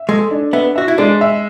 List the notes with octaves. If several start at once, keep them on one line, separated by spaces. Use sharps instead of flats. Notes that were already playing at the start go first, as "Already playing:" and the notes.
Already playing: E5
G#3 A4
D4
B3 E5
F#4 E5
E4
G#3 D4
E5